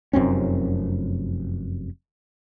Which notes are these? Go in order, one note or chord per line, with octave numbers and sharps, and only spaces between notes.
F1 F#2 C4 C#4